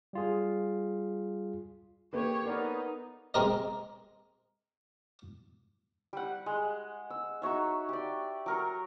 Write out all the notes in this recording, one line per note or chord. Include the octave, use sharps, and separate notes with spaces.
G3 F4 G#4
A#3 G4 A4 B4 C#5
B3 D#4 A#4 D5
G#3 C4 A#4 D#5
G3 F#5
G#3
E6
D#4 F#4 C#5 E5
G4 D5
F#3 A#4 C#6